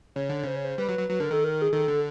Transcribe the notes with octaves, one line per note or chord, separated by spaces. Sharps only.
C#3 C#5
D3
C#3 C5
C#5
C5
G3 B4
F#3
F#3
F#3 B4
D3 A#4
D#3 A4
A#4
G#4
D#3 A4
D3